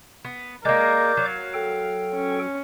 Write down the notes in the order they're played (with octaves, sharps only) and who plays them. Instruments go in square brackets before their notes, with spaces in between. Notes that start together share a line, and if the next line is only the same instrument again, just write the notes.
[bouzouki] B3
[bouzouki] G#3 A#3 [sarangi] A#4 [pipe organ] D5 D6 G6
[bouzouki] F#3 [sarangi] F5
[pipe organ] A4 G5
[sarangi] C#4